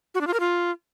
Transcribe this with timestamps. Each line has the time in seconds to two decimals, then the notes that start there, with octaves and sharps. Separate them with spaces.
0.15 F#4
0.21 D4
0.27 F4
0.34 A#4
0.40 F4